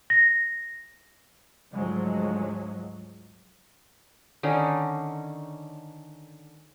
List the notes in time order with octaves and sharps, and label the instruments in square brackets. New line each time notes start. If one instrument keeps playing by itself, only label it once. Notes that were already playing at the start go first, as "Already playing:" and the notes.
[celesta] A#6
[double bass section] D2 G#2 F3 F#3 G#3
[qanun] D3 D#3 C#4 D#4